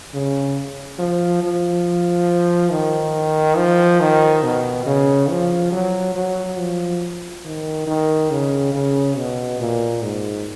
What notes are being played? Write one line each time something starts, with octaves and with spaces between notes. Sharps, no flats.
C#3
F3
F3
D#3
F3
D#3
B2
C#3
F3
F#3
F#3
F3
D#3
D#3
C#3
C#3
B2
A#2
G#2